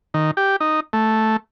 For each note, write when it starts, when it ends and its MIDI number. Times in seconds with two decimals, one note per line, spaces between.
0.14 0.31 51
0.37 0.56 67
0.60 0.80 63
0.93 1.37 57